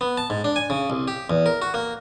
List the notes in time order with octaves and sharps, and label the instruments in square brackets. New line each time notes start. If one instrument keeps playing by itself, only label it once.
[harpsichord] B3
A5
G#2
D4
G#5
C#3
C2
G4
E2
A#4
F#4
A#3